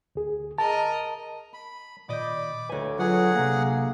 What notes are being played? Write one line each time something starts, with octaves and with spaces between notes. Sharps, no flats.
D2 G#4
A#4 D#5 A5
B5
A#2 D#3 D5 D#5 B5 D6 G6
D2 B4 C#5 G#5
F#3 F4 G#4 A4 B4 F#5
C3 F#3 A#3